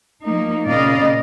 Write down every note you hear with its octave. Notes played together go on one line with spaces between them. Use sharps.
F3 A#3 D#4
A#2 C#3 D5 D#5 F5